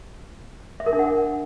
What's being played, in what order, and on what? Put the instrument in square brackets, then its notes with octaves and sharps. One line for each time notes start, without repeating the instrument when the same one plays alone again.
[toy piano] E5
A#4
D4
F#5